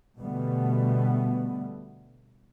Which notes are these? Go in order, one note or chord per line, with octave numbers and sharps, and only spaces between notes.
B2 D3 G3 A3 B3